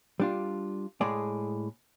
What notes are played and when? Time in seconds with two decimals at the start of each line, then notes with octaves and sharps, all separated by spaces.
0.20 G3 D4 F4
1.01 A2 G#3 G#4 D5